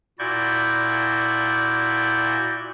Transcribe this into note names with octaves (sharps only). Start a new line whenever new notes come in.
A#2 E4 F#4 D5 G6 G#6